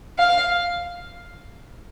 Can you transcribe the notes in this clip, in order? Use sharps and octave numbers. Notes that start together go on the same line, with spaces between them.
F5